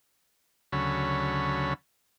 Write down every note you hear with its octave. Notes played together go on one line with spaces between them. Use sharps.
D2 C#3 F#3 C#4 A4 B5